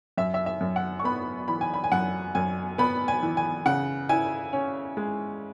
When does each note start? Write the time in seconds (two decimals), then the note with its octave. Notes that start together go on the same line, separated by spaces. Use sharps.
0.18 F#2 E5
0.34 E5
0.46 E5
0.61 F#2
0.76 F#5
0.99 C#6
1.04 B3 B5
1.48 E3 B5
1.61 G#5
1.74 B5
1.84 G#5
1.92 F#2 F#5
2.35 F#2 G#5
2.78 B3 B5
3.08 G#5
3.23 E3
3.37 G#5
3.66 C#3 F#5
4.09 E4 G#5
4.53 C#4
4.97 G#3